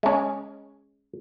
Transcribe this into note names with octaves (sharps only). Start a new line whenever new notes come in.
G#3 C#4